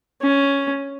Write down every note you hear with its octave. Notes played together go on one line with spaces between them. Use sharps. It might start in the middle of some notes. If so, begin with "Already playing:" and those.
C#4